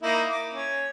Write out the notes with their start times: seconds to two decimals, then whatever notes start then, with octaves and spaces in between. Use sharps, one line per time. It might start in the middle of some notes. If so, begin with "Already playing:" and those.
0.03 A#3 D#4 E4
0.30 D6
0.53 C#4